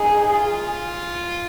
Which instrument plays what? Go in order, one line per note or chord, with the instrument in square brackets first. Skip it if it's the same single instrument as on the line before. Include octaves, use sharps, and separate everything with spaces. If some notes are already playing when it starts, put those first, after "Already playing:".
Already playing: [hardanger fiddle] D#4 [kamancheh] G#4
[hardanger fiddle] F4